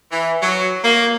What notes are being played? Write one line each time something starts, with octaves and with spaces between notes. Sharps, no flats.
E3
F#3
A#3